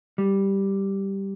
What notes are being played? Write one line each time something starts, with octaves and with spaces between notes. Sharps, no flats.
G3